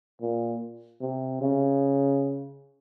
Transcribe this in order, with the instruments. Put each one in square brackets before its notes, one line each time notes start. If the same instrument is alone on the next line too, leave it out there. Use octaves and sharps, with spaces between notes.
[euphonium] A#2
C3
C#3